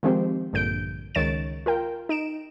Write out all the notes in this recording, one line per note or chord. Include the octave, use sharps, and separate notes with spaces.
D#3 F3 G#3 C4 G4 C5
A#1 G2 D3 G6 D7
C#2 D#3 C#5 A6 D7 E7
F4 A#4 G5
D#4 D7 E7